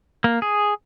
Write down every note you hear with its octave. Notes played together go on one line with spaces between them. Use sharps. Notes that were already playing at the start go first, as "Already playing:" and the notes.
A#3
G#4